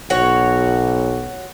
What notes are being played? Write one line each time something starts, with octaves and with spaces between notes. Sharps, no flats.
B1 F#4 C#5